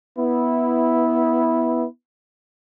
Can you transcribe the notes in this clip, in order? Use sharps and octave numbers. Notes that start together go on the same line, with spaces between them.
B3 E4